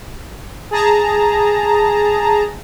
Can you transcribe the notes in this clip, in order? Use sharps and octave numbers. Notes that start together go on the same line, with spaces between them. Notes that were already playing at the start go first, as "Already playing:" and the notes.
G#4 A5 A#5